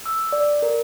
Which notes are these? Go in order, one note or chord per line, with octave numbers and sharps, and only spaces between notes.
E6
D5
A#4